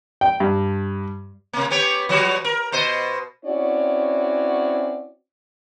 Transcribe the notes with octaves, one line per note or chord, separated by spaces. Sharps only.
G5
G2
C3 A#3
B3 G4 C#5
F3 G3 F#4
A#4
B2 C5 D#5
C4 C#4 E4 F#4 C#5 D5